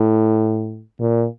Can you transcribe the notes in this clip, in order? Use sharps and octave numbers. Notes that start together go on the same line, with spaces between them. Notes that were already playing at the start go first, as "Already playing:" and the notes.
Already playing: A2
A#2